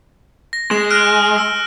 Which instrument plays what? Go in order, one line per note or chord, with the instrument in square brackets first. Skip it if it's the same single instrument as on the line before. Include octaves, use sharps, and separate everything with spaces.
[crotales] A#6
[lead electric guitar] G#3 [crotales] E7
[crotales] F6 F#6 D7
E6